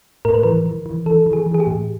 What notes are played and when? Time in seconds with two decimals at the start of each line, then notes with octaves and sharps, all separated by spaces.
0.25 A2 A#4
0.34 B4
0.43 E3 A#4
0.66 E3
0.86 E3
1.06 E3 A4
1.26 E3
1.33 G#4
1.46 E3
1.54 G#4
1.60 G4
1.67 A2